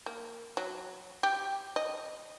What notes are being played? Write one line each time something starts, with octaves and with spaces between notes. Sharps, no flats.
A#3
F#3
G4
D#5